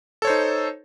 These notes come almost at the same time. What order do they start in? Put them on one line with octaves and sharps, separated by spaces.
A4 C#5 C5 D#4